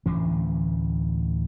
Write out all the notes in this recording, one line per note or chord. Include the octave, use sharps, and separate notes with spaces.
D1 D2 E3 C#4